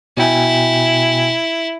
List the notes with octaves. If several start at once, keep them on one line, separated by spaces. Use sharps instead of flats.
B2 E4 G5 G#5